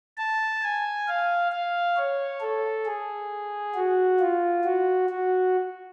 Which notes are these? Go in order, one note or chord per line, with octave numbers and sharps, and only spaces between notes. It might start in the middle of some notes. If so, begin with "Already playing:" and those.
A5
G#5
F5
F5
C#5
A4
G#4
F#4
F4
F#4
F#4